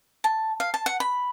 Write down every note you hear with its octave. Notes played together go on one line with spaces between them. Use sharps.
A5
F5
A5
F#5
B5